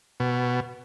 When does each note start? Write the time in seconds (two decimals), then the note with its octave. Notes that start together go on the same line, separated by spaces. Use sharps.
0.20 B2